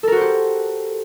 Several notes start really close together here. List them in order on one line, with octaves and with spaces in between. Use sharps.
A4 A#4 F#4 C5 G4